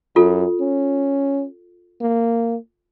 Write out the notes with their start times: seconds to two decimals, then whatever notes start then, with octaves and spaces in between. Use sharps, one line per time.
0.16 F#2 F4 A4
0.60 C#4
2.00 A#3